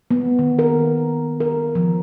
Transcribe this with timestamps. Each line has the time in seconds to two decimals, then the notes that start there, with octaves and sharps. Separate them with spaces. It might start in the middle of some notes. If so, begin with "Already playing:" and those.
0.11 B3
0.39 D#3
0.59 A#4
1.40 A#4
1.75 F3